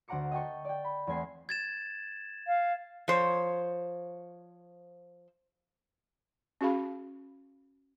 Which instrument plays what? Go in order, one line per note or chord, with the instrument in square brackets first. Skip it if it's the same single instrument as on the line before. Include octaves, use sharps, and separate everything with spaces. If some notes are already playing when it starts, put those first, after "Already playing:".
[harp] D2 C5 F#5 A#5 D6 C#7
D#5 G5 A5 C#6
D5 G5
B5
E2 A3 C4 G#5 C7
[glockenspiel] G#6 A6 E7
[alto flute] F5
[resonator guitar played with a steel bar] F3 C5 C#5
[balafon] C#4 F#4 G#4 F5 B5